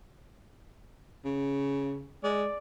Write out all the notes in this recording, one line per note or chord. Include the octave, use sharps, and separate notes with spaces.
C#3
G#3 D5